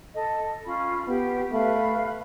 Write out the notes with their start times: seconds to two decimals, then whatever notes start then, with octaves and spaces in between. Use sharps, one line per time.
0.14 A4 D#5
0.65 C#4 F4 B5
1.08 B3 G4
1.52 A3 B4 F5 B5